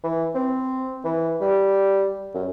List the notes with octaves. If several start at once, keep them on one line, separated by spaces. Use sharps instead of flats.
E3
C4
E3
G3
F#2